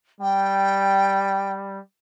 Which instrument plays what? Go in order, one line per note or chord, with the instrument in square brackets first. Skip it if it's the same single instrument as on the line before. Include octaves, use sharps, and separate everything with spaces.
[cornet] G3 [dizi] G5